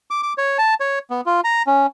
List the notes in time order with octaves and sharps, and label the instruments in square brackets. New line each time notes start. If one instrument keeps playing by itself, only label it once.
[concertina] D6
D6
C#5
A5
C#5
B3
F4
A#5
C#4